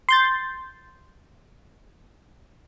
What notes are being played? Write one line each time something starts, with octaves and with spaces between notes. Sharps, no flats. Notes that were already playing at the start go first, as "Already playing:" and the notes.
C6 G6 A6